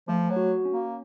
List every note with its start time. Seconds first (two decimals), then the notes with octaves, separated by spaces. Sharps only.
0.08 F3 A3
0.30 F#3
0.36 F#4
0.65 C#4
0.73 A#3